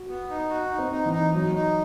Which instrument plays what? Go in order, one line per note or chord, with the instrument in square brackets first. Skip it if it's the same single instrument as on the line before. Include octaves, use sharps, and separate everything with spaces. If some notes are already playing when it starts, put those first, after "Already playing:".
Already playing: [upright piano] F#4
[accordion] B3
D#4
F#4
D#4
[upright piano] C4
[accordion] D#4
[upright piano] E3
[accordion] D#4
[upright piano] F#3 [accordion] D#4
[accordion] D#4